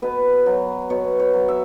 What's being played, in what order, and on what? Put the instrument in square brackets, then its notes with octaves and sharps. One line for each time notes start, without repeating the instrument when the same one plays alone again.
[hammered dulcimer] B2 B4
F#3
B2 C#5
C#5
F#3
E5